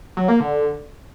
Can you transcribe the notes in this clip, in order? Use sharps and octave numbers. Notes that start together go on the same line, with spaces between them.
F#3
A#3
D3